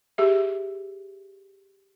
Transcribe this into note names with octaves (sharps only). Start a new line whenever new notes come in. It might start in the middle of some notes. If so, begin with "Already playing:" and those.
G4 G#4 E5